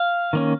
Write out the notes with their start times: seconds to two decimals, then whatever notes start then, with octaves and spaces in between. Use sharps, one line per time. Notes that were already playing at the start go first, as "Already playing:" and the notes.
Already playing: F5
0.33 D#3 A#3 C#4